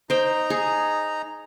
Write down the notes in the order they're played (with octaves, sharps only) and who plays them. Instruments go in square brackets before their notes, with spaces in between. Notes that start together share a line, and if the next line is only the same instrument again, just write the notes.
[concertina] D#4 A#5 [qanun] C5 G5
[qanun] G#4